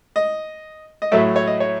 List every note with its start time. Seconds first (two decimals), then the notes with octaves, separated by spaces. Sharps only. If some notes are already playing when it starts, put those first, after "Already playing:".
0.16 D#5
1.02 D#5
1.12 A2 F#3 A3 E5
1.36 C#5
1.47 D#5
1.60 C#5